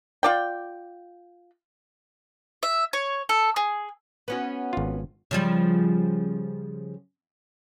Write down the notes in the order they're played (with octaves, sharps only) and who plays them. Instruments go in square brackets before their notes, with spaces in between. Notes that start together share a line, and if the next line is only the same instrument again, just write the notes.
[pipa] F4 D5 G5
[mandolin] E5
C#5
A4
G#4
[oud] B3 C#4 F#4
[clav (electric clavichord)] G#1 F4
[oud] C#3 F3 G3